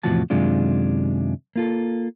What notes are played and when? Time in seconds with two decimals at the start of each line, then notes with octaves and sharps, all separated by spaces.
0.03 E2 A2 C3 F3 F#4 A5
0.30 F#2 C3 D#3 G#3 D4 F4
1.56 A#3 F4 A4